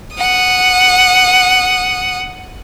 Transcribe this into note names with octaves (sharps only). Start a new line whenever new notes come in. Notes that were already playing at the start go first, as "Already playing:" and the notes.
F#5 D#6